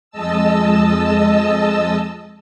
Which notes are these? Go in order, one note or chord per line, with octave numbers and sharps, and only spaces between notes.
F2 G#3 D#5 A5 E6